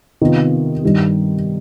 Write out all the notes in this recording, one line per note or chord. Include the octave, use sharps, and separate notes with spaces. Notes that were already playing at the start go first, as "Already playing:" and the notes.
C3 D#3 B3 F4
G2 D#3 G3